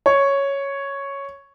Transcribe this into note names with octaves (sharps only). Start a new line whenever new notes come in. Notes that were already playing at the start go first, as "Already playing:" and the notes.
C#5